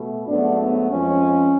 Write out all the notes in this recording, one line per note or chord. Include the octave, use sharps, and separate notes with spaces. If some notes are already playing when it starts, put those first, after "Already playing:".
Already playing: B2 A3
G#2 F#3 A3 B3 D4
B3
F2 F3 G#3 C#4